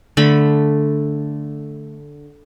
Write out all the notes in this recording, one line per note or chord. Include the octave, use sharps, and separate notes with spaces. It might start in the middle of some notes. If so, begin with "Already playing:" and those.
D3 A3 B5